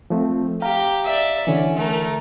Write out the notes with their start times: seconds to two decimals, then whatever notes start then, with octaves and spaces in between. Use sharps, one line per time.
0.10 F3 A3 C4
0.62 G4 F5 A#5
1.05 D5 E5
1.47 D3 E3 C#4
1.76 A3 A#4